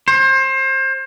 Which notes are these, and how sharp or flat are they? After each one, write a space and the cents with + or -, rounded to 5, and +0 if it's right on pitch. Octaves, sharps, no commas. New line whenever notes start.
C5 +30